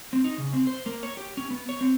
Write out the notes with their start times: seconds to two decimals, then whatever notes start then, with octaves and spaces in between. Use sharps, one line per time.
0.13 C4
0.24 D#4
0.38 C#3
0.53 C4
0.67 C5
0.86 A#3
1.03 C#5
1.17 G4
1.37 C#4
1.51 B3
1.69 C#5
1.81 C4